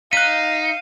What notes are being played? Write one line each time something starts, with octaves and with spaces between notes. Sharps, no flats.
D#4 F5 F#6 B6 D#7